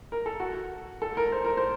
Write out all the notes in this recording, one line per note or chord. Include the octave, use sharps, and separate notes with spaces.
A#4
A4
F#4
A4
A#4
C5
A#4
C5